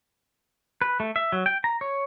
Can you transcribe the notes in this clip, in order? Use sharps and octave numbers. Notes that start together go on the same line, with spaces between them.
B4
A3
E5
F#3
G5
A#5
C#5